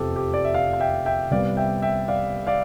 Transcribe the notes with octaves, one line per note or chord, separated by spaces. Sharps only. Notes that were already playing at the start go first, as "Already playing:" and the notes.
Already playing: F1 E2 C3 F3 C4 G4 A4
G4
D5
E5
D5 F5
F5
E5 G5
E5 G5
C2 C3 G3 B3 D5 F5
E5 G5
E5 G5
D5 F5
D5 F5